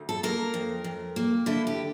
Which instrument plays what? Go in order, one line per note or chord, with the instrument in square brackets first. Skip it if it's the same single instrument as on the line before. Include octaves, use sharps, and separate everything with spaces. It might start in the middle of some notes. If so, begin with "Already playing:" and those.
Already playing: [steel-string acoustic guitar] D2
A4
A#3 A#4
F2
F2
A#3
D3 E4
G4